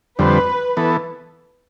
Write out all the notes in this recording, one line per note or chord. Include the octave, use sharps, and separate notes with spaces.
F2 D3 G3 C4 B4
E3 B3 A4